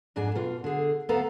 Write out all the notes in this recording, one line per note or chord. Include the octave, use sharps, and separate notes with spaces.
F2 G#2 D4 G#4 G#5
B2 F4
D3 G#4
D2 B3 A4 B4 F5 A#5